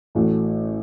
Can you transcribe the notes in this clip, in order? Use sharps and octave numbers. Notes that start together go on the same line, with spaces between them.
A1 A2 A3 F#4